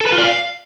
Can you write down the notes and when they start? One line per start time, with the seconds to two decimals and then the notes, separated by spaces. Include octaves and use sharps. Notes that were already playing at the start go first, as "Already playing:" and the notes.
0.01 A4
0.07 B4
0.12 F4
0.18 D5
0.24 F5